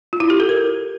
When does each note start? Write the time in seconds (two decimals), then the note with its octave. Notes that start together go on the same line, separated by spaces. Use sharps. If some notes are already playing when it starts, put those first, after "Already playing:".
0.13 F4
0.20 E4
0.30 G4
0.40 A4
0.49 A#4